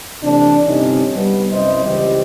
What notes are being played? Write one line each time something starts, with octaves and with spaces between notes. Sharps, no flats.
C3 E3 A3 C4 D4
G1 C3 C4 C#4 D#4 D#5
G3 B3
C2 F#2 E4 C5 D#5
C#2 E3 G3 G4 C5 D#5